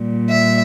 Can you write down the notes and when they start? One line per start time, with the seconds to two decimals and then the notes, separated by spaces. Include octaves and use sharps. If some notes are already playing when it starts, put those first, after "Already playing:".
Already playing: A#2 G3
0.29 E5